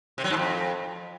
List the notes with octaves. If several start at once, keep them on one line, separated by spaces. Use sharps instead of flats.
C3
F#3
G#2
F2